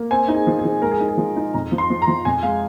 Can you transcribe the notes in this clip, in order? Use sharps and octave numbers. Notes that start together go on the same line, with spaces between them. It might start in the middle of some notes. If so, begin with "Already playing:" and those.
Already playing: A#3
C4 G#5
D#4
G#4
F3
G#4
F3
G#3 A#4
G#4
D#4
G#4
F3
D#4
F2 A#5
F3
C6
F3
A#5
F3
F2 G#5
G#3 F5